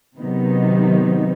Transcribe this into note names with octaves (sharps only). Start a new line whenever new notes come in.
C3 D#3 F#3 B3 D#4